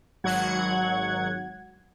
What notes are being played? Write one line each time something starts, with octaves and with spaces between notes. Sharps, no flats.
G#1 F#3 F#5 G#6